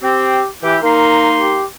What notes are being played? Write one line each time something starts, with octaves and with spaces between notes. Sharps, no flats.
C4 G4
E3 E4 G4
A#3 D#4 A#4 C6
G4